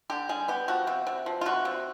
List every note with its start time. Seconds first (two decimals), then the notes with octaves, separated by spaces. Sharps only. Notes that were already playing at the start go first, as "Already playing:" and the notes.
0.10 D3 G4
0.29 G3 G#4
0.48 B3 G4
0.68 F3 F#4
0.87 C3
1.07 C3
1.26 F3
1.41 F4
1.46 C3 F#4
1.65 C3